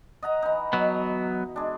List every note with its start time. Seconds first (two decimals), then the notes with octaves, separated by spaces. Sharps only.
0.23 D#5 F#5 A#5
0.42 E3 D#4
0.73 B2 F#3 B3
1.56 G#3 D4